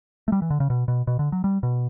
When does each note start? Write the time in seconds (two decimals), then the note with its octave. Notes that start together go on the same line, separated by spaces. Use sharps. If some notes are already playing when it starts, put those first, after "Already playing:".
0.28 A3
0.32 G3
0.42 E3
0.50 D3
0.60 C#3
0.70 B2
0.88 B2
1.07 B2
1.19 D3
1.32 F#3
1.44 G3
1.63 B2